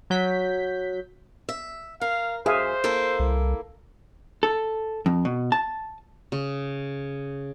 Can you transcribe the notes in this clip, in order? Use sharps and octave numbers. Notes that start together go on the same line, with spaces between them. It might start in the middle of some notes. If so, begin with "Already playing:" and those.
F#3 G6 B6
E5
A#4 F5
F#2 G#4 C5 E5 F5
A#3 E4 A4
C2
A4
F2
B2
A5
C#3